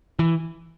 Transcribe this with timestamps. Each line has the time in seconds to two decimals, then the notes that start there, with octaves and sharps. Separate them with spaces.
0.19 E3